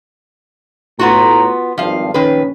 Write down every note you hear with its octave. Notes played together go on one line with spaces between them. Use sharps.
A2 B3 F4 F#4 A#5
G#1 G2 F3 F5
A#1 D#3 C#4 B4